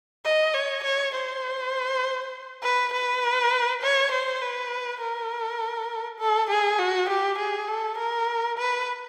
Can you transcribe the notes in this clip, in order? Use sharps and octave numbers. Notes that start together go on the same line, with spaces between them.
D#5
C#5
C#5
C5
B4
B4
C#5
C5
B4
A#4
A4
G#4
F#4
G4
G#4
A4
A#4
B4